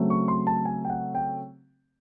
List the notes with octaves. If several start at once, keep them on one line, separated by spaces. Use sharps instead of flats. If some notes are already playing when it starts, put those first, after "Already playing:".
Already playing: C#3 F#3 A3 C4
C#6
C6
A5
G#5
G5
F#5
G5